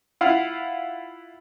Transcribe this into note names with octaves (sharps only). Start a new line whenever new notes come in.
E4 F4 F5 F#5